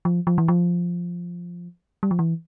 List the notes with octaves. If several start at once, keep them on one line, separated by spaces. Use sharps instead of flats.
F3
F3
E3
F3
G3
F3
E3